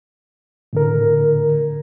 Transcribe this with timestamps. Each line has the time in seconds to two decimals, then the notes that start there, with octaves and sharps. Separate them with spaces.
0.73 A2 D3 A#4